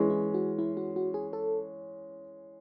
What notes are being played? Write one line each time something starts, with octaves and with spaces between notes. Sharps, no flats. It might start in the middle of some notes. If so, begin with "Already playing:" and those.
Already playing: E3 G#3 C#4
E4
F#4
E4
F#4
F#4
G#4
A4